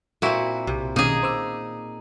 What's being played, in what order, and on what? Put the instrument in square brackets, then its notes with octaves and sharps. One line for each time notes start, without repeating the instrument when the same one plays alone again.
[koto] A#2 E4 [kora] C4 F#4
[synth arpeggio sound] B1 [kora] C3
[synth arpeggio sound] B2 D#3 C#4 [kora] A#3 [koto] D#4 G#4
[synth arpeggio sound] C5 D6 E6